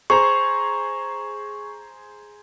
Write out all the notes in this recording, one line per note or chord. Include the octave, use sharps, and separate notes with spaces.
G#4 C5 A#5 C#6